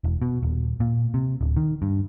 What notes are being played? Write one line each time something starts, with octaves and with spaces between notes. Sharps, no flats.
E1
B2
D#1
A#2
C3
D1
D#3
G2